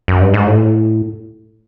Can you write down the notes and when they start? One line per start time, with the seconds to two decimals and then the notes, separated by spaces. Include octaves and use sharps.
0.08 F#2
0.21 G2
0.34 G#2
0.47 A2